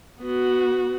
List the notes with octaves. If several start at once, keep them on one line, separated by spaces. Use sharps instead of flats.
B3 F#4